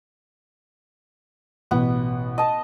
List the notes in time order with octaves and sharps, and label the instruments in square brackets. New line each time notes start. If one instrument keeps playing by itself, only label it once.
[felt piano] A1 B2 F#5 [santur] B3
[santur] D#5 A5